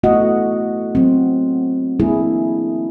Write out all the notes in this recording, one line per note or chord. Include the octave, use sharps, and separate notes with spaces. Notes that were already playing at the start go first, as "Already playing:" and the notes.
A3 B3 E4 F#4 D#5 F#5
F#3 C4
G#3 A#3 D4 E4 G#4